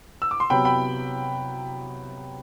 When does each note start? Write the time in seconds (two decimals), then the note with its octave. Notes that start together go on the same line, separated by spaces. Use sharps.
0.22 E6
0.31 D6
0.40 C6
0.50 C3 F#3 B3 G5 B5
0.65 G5 B5